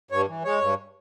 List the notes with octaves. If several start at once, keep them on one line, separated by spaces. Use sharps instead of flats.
G2 C#5
E3
G#3 C#5
G2